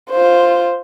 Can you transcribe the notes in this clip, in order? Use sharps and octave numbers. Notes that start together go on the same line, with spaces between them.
F4 C5